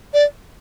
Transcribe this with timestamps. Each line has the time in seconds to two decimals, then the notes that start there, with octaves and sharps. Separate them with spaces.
0.14 D5